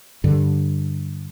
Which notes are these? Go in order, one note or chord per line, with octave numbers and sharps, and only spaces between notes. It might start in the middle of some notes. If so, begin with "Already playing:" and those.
G2 D3